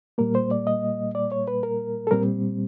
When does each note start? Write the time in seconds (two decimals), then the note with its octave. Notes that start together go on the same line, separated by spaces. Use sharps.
0.18 A#2 G3 A#3 A#4
0.35 C5
0.51 D5
0.67 D#5
1.15 D5
1.32 C#5
1.48 B4
1.63 A#4
2.07 A4
2.11 A#2 G3 C4 A#4